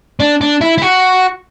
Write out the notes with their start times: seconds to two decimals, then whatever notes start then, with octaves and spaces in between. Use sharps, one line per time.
0.20 D4
0.41 D4
0.61 E4
0.78 E4
0.82 F#4